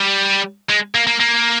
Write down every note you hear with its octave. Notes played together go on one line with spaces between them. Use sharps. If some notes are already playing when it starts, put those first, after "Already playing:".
Already playing: G3
G#3
A#3
A#3
A#3